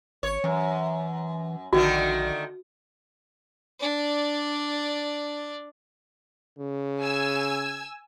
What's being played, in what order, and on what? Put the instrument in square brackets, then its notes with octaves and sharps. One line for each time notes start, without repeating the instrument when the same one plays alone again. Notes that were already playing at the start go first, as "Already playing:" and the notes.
[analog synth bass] G#1 [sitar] C#5
[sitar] F#2 [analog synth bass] E3
[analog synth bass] A#1 [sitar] D3 D#3 A3 [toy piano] F#4
[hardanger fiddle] D4 D5
[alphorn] C#3
[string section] G#5 E6 G#6